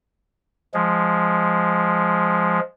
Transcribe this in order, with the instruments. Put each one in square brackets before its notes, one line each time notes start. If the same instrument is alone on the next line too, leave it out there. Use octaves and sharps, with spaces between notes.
[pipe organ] F3 G#3